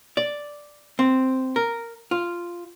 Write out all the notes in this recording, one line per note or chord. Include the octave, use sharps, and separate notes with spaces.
D5
C4
A#4
F4